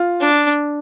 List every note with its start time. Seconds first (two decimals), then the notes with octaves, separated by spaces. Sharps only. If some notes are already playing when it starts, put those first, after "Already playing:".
Already playing: F4
0.21 D4